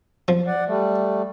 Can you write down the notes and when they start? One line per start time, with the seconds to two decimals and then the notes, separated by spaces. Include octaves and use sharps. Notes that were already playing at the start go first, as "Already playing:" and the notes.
0.28 F3
0.47 D5 F#5
0.67 G3 A3